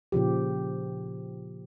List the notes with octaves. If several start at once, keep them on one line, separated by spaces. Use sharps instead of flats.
A#2 C#3 F3 G4